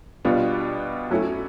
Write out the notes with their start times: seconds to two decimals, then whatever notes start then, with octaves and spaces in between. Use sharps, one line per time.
0.25 B2 G3 B3 D4 F4
1.11 F#3 A3 C#4 E4